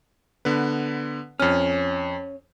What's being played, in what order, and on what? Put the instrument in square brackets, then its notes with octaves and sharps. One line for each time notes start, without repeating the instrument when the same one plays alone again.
[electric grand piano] D3 B3 B4
[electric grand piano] F2 F6 [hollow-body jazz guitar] C#4